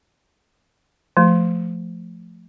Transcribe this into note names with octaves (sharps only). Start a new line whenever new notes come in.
F3 A3